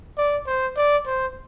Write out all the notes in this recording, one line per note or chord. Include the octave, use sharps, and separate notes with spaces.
D5
C5
D5
C5